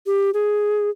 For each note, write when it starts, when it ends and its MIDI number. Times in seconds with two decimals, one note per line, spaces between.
0.07 0.30 67
0.34 0.90 68